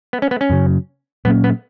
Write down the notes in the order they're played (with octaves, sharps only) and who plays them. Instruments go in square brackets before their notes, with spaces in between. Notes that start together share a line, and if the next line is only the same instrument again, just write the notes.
[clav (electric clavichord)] B3
C#4
B3
C#4
[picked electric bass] F#2 C#3 F#3
[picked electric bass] A#2 F#3 A#3 C#4 [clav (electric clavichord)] B3
[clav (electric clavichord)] B3